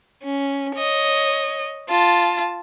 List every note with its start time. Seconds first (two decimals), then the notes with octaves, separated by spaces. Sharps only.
0.23 C#4
0.76 C#5 D#5
1.89 F4 A5